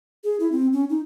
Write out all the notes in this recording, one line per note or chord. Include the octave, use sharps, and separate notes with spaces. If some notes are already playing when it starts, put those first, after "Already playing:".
G#4
E4
C4
C#4
D#4